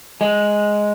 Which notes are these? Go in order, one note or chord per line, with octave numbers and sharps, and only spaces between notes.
G#3